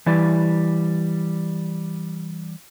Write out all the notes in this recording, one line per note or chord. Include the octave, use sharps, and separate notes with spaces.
E3 G3 E4 D5